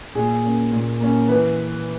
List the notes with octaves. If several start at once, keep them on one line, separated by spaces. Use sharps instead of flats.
A#2 G#4
A#3 C#4
A#2
A#3 C#4
E3 B4